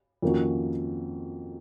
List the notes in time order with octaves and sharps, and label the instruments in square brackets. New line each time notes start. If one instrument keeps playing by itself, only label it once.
[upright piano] F2 D#3 A#3 C#4 F#4